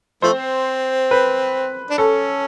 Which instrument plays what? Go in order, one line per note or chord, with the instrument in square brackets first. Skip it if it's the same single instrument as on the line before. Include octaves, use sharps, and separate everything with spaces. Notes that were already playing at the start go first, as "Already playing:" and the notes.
[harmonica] F3 A3 C4 [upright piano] C5
[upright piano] B4
[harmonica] D4
[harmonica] C#4 [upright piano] A4